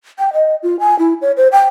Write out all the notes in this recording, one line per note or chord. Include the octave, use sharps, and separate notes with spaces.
G5
D#5
F4
G#5
E4
C#5
C5
G5